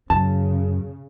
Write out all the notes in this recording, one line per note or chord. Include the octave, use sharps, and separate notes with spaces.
F#2 C#3 A5